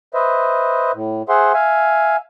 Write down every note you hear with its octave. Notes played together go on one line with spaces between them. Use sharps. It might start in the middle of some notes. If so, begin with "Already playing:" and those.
B4 C5 D#5 E5
A2
G#4 C5 E5 F#5 C6
E5 F5 G#5